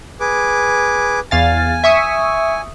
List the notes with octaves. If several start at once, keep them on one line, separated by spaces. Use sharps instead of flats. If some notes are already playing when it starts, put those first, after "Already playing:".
G#4 B4 D6
E2 F5 G#5 A6
E5 C#6 D#6